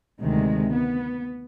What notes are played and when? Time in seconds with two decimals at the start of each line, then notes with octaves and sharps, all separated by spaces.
0.22 D2 C3 D#3 G#3
0.71 B3